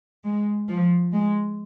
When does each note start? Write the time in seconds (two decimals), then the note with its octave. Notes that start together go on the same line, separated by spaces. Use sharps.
0.25 G#3
0.69 F3
1.13 G#3